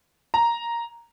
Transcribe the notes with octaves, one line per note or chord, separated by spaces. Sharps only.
A#5